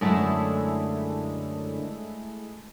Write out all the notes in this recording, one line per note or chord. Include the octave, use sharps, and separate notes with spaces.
F#2 D3 G#3 A3 E4